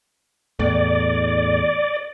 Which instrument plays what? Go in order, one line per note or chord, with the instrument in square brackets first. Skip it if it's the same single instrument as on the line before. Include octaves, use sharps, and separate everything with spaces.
[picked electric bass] E2 A2 [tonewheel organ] D5